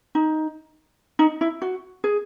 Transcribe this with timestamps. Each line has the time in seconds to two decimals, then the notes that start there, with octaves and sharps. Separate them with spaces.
0.15 D#4
1.19 D#4
1.41 E4
1.62 F#4
2.04 G#4